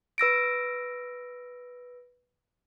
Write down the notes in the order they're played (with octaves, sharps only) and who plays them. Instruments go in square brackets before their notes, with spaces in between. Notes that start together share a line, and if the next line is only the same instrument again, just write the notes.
[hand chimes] B4 E6 A#6 D7